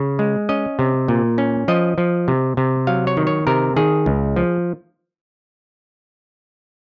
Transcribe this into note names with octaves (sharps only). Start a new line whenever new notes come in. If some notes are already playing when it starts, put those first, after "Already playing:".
Already playing: C#3
G#3
C#4 D#5
C3
A#2
C#4
F3 D#5
F3
C3
C3
F#3 F5
C#5
D#3
C#5
C3 A#4
D#3 G#4
C#2
F3